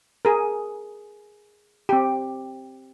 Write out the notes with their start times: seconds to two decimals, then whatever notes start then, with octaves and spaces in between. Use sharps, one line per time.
0.25 G#4 A#4
1.89 C4 G4